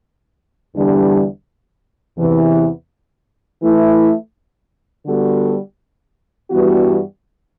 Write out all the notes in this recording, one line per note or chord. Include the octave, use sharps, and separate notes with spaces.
E2 D3 G3 D4
E2 C3 E3
E3 A3 E4
D3 G3 B3 F#4 A4
G2 E3 G3 B3 F#4